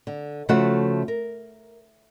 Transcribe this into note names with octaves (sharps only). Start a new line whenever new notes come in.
D3
C#3 F3 A3 F#4 E5 F#5
A#4